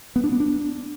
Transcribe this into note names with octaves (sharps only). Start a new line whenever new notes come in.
B3
D4
B3
D4